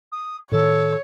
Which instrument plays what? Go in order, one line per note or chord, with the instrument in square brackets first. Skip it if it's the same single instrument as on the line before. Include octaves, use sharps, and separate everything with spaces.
[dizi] D#6
[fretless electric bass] A2 D#3 [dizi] A4 [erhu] C#5